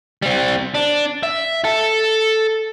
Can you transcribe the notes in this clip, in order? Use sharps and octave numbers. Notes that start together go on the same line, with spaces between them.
G3 C4
D4
E5
A4